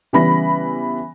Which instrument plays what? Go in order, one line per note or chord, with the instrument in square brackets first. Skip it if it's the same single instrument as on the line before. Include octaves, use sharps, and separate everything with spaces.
[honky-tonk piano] C#3 E3 G3 B3 B5 A#6